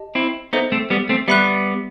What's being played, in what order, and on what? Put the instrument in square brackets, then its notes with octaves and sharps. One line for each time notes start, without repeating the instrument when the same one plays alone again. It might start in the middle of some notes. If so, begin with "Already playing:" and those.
Already playing: [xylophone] G4 D#5 A5
[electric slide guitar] C4 E4
[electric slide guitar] B3 D#4 [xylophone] A4 C5 E5
[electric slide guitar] A3 C4
G3 B3
A3 C4
[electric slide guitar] G3 B3 [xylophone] E5 B5 F#6